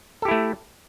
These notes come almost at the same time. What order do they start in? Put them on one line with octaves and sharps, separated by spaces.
A4 G4 E4 A3